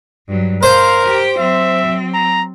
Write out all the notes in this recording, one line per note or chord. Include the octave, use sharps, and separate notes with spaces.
G2 F#3
A#4 C5 F5
G4 G5
F#3 C4 E5
A#5